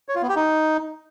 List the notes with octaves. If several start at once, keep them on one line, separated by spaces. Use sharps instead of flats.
C#5
F4
B3
G4
D#4